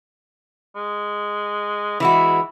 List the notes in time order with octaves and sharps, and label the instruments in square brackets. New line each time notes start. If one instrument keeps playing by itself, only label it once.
[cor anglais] G#3
[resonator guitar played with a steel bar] E3 G#3 F#4 [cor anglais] E4